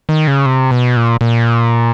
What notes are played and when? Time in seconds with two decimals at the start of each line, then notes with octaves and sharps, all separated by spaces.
0.09 D#3
0.27 C#3
0.46 C3
0.71 B2
0.97 A#2
1.21 A#2